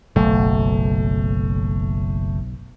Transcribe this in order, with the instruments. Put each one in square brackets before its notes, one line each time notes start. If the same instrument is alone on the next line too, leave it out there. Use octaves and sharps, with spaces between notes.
[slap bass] F#1 [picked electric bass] B1 [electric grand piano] A3